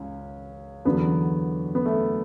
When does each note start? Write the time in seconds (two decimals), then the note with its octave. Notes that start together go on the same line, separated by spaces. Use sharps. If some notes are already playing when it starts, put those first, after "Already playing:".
Already playing: C#2 C#4
0.85 E2 D3 F#3 B3
1.75 B3
1.86 A3